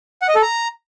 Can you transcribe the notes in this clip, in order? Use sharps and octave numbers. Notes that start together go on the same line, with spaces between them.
F#5
D#5
A4
A#5